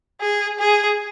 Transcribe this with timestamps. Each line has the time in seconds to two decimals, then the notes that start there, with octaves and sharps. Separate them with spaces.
0.21 G#4
0.59 G#4